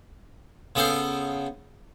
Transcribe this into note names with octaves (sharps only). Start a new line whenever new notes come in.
C#3 B3 A4 C5